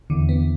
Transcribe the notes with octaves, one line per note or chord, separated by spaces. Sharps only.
E2 D3
B3